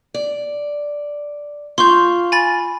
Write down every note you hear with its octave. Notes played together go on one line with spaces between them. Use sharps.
D5
F4 F5 C6 C#6 G6
G#5 B5 A6